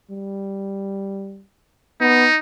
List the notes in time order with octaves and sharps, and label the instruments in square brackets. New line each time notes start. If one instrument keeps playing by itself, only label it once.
[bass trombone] G3
[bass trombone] B3 [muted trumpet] D#4